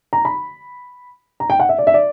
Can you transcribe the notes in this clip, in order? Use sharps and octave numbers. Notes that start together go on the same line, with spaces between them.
A#5
B5
A#5
G5
F#5
E5
D5
E5
D5